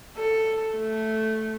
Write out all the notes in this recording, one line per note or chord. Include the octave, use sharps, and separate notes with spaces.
A4
A3